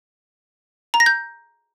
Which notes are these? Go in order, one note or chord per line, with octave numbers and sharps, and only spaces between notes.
A#5
A#6
G6